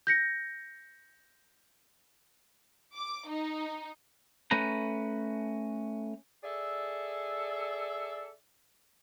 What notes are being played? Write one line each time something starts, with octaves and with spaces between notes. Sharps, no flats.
G6 A#6 C#7
D6
D#4
A3 C#4 B4 A#5
G#4 A4 D5 E5